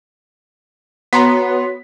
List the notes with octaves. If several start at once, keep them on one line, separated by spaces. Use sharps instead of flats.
B3 F#4 C#5 A#5 C6 B6